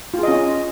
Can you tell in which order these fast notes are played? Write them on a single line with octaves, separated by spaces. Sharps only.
F4 G#4 D#5 C#4